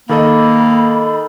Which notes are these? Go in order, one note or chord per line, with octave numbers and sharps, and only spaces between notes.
D#3 A#3 A4 D#5 B5